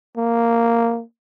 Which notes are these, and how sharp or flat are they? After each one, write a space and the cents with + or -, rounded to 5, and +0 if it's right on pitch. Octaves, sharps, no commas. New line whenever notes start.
A#3 -5